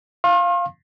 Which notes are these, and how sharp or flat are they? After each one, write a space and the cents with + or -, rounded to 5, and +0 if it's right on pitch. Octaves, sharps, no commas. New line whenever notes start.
F5 +0 C6 +45